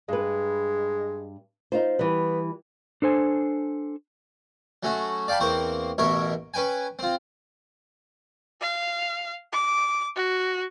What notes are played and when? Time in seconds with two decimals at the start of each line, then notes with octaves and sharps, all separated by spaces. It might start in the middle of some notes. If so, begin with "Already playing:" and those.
0.09 G2 G#3 B4
1.72 D#4 F4 C5
1.99 E3 G3 B3
3.02 D4 A4 C5 G#5
4.83 F#3 A3 C#4 F#4
5.28 D5 F5 G5 A5 B5
5.40 E2 A#3 C4 C5 C#6
5.98 A1 B2 A#4 C#5 E5
6.54 C#4 B4 G5 G#5
6.99 C4 F4
8.61 F5
9.53 D6
10.16 F#4